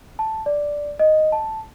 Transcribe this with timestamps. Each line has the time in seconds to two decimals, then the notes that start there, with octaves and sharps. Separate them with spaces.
0.19 A5
0.46 D5
0.99 D#5
1.32 A5